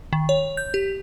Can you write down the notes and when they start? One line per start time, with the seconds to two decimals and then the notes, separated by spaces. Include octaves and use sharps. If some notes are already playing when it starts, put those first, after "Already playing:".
0.13 D#3
0.29 C#5
0.57 G6
0.74 G4